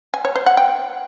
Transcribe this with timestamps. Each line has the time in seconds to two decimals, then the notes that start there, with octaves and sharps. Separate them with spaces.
0.14 G#5
0.25 C#5
0.36 C5
0.46 F#5
0.57 G5